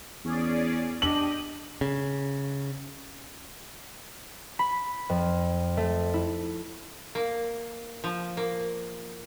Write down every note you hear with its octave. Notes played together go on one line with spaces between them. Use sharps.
E2 C#4 G#4 D5
D4 G4 D#5 F#7
C#3
B5
F2
A3
E4
A#3
F3
A#3